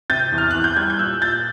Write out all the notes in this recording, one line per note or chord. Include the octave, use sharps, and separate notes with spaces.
C3 G6 A6
E2
F6
E2 F#6
G6
G3 F#6 G#6
G6
A#2 E6 F#6
A#2 G6 A6